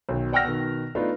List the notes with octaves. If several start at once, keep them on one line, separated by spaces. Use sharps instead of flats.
B1 D#3
D5 F#5 G5 E6 F6 A#6
B2 D#3
A3 B3 D4 D#4 F4